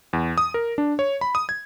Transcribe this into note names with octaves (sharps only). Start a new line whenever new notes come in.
E2
D#6
A#4
D4
C#5
B5
D#6
G#6